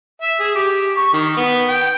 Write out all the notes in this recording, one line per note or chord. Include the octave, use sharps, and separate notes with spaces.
E5
G#4
G4
C#6
D#3
B3
G5